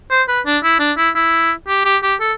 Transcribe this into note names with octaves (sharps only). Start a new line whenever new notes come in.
C5
B4
D4
E4
D4
E4
E4
G4
G4
G4
A4